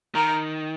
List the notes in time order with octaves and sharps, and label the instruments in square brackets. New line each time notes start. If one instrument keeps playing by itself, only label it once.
[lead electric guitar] D#3 [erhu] A#4